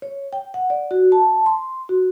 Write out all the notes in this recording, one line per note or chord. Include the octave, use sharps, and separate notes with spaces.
C#5
G5
F#5
D5
F#4
A5
C6
F#4